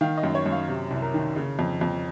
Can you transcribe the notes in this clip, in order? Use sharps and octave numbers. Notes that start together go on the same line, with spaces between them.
D#3 F5
D#5
F#2
C#5
F#2
F5
C3
C2
A#4
D#3
C#3
F2
F2